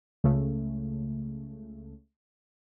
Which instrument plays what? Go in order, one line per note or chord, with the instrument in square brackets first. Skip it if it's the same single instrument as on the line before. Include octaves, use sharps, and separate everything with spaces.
[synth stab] C#2 C#3 A3